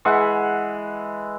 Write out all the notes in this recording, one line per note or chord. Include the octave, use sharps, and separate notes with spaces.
E3 G#3 E5 F#5